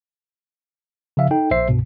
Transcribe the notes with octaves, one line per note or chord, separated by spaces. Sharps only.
C#3 F3 E5 F5
D#4 A4 G5
A#1 C5 E5 C7
C2 G2 B2